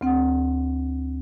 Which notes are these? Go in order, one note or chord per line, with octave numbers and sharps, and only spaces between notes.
D2 C4 F#5